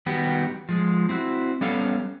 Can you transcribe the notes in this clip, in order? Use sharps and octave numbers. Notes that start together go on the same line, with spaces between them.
D#3 G3 B3 F#4 G4
F3 G#3
C4 E4 F#4
G3 B3 C#4 A4 F5